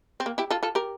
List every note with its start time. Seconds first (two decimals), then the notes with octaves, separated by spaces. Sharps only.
0.20 C4
0.26 A#3
0.38 E4 G4
0.50 F4 A4
0.63 F4 A4
0.75 G4 A#4